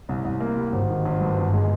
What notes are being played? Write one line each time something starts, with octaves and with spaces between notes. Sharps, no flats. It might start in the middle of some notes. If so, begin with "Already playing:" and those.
C2
C2
A#3
G3
G#1
D#3
G#1
G2
G1
G#3